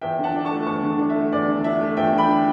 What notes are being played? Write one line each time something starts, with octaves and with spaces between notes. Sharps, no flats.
E2 E5 G5
D3 F#5 A5
D4
A5 C#6
A3
E2 A5 C#6
D3
D4
E5
A3
E2 D5
D3
D4 E5
A3
E2 E5 G5
D3
G5 B5
D4